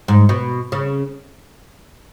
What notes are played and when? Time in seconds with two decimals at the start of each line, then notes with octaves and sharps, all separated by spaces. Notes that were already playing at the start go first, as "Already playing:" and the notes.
0.08 G#2
0.29 B2
0.72 C#3